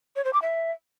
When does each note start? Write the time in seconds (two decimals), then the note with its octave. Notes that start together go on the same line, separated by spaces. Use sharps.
0.16 C#5
0.25 C5
0.33 D6
0.42 E5